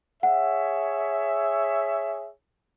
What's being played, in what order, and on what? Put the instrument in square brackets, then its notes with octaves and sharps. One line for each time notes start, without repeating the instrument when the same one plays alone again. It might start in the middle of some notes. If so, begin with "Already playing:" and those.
[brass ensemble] G#4 C#5 E5 [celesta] F#5